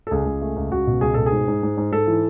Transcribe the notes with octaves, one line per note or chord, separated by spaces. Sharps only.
A4
C#2 G#4
C#2
A3
C#2
C#2 F#4
B2
C#2 G#4
B2 A4
G#4
G#2
G#2
G#2
G#2
G#2 A4
E3